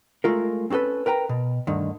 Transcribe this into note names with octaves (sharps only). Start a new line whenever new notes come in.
G#3 A3 F4 A#4
C4 C#4 F#4 A4 B4
A#4 B4 G5 A#5
B2
D2 G2 D3 D#3